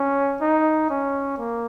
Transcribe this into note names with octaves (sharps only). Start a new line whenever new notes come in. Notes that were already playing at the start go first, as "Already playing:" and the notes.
Already playing: C#4
D#4
C#4
A#3